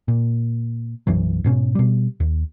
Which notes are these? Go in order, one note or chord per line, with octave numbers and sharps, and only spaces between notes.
A#2
B1 F#2 E3 F#3
G#2 B2 C#4
B2 G3
D#2